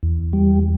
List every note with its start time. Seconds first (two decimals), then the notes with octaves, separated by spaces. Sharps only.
0.03 E2
0.33 G3